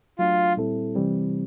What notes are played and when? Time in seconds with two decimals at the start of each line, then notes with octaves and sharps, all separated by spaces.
0.18 F#3 A3 D4 F4
0.57 A#2 G3 C4 E4 A4
0.95 C3 E3 G3 C4